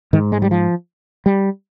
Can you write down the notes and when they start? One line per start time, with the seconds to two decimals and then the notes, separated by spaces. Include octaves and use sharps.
0.13 G#2 D#3
0.32 G#3
0.42 G3
0.51 F3
1.26 G3